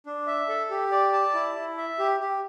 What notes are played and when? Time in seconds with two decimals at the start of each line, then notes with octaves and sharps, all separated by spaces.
0.06 D4
0.27 E5
0.48 A4
0.70 G4
0.92 D5
1.13 A5
1.34 E4
1.56 E4
1.77 E5
1.99 G4
2.20 G4